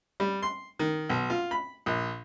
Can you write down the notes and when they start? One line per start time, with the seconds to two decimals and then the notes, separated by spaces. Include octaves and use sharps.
0.20 G3
0.42 C6
0.79 D#3
1.09 B1
1.30 F4
1.51 B5
1.86 A#1